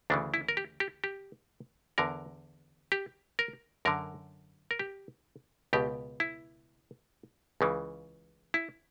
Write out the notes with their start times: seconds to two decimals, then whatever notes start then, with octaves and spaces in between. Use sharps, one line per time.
0.10 D2 C#3 E3 D4
0.34 E4
0.49 A#4
0.57 G4
0.80 G4
1.04 G4
1.98 E2 D3 A#4
2.92 G4
3.39 A#4
3.85 F#2 D3 A#4
4.71 A#4
4.79 G4
5.73 C#2 B2 G4
6.20 E4
7.61 C#2 C#3 E3
8.54 E4